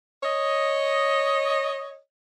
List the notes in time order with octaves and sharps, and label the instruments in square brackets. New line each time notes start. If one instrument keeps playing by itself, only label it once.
[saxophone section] C#5 D#5